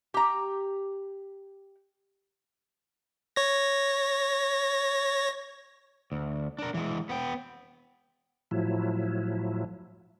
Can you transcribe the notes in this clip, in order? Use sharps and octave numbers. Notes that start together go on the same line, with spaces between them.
G4 A#5
C#5 A#6
D2
D4 A#4
E3 G#3
B3 G5
A2 F3 F#3 E4